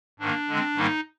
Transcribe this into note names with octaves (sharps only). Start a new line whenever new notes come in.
G#2 D#3 A#3 D4
D3 G#3 C4
G#2 D#3 G3 A#3 D#4